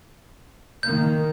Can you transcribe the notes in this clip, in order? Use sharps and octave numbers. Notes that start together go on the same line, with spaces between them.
D#3 A#3 G6